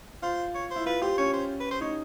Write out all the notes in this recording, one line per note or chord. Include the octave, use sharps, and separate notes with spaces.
F4 C5
C#5
C5
E4
F4 B4
G4 C5
C#4 C#5
C5
B4
C5
D#4 C#5